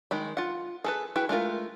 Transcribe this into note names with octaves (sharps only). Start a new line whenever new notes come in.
D#3 G#3 B5
F4 F#5
G#4 A4 B4
E4 F#4 G#4 B4 G5
G#3 A3 F4 A#4